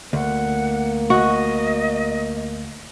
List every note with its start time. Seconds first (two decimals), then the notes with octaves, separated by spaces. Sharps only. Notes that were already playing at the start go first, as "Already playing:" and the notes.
0.13 D2 A#3 F#5
1.10 F#4 D#5